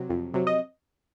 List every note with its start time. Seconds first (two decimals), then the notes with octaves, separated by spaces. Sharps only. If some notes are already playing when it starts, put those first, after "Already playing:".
Already playing: C3 F#3
0.10 F2
0.34 C3 F#3
0.47 D#5